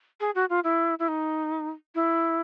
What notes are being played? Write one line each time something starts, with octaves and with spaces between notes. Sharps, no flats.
G#4
F#4
F4
E4
E4
D#4
E4